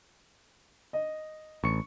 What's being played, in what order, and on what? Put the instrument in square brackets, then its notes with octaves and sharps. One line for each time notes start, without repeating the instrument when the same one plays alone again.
[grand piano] D#5
[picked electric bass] A1 [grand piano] C#6 C#7